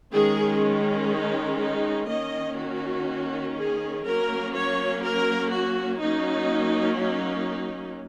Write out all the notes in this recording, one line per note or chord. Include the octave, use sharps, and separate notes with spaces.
D#3 G#3 C#4 G#4
D#4
D#4
D#3 A#3 C#4 D#5
F#4
G#4
F#3 A#3 C#4 A#4
C#5
A#4
F#4
F#3 A#3 C#4 D#4
D#4